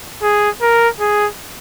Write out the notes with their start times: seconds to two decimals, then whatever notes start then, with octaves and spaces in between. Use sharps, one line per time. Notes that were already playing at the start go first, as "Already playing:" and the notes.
0.22 G#4
0.61 A#4
1.00 G#4